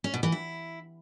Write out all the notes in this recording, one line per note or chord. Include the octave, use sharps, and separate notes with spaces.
C#4
B2
E3
E4